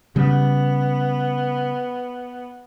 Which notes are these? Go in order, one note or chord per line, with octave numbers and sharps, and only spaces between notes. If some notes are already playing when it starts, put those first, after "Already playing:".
C#3 G3 B3